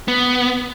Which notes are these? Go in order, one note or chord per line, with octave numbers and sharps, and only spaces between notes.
B3